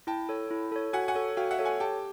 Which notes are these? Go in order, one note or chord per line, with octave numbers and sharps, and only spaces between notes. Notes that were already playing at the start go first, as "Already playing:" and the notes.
E4 G5 A5
A4 C#5
E4
A4 C#5
F#4 F#5 G#5
F#5 G#5
A4 C#5
F#4 F5 G5
E5 F#5
A4 C#5
F#5 G#5
G4 G5 A5